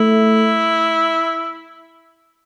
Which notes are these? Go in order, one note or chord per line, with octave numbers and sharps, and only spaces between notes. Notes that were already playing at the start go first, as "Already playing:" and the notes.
Already playing: A3 E4